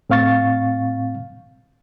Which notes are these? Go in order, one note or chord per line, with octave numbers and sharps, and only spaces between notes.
A2 C4 F5 C#6 A6